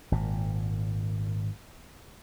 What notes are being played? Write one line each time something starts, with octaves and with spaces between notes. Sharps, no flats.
G#1 A#2